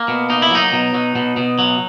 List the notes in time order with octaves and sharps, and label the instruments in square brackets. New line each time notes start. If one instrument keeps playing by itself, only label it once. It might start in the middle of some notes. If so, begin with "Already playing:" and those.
Already playing: [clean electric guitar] A#3
B2
A#3 D#4
E4
F#3 D#4
B2
F#3
B2
B2
F#3